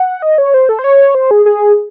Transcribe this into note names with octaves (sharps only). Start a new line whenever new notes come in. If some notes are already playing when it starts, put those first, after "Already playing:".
Already playing: F#5
D#5
C#5
C5
A4
C5
C#5
C5
G#4
G#4